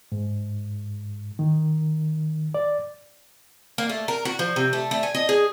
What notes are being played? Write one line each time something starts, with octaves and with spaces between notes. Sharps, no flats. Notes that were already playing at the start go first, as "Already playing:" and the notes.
G#2
D#3
D5
A#3
A3
A#4
F#4
F3
C3
A3
A3
G#5
D#5
G#4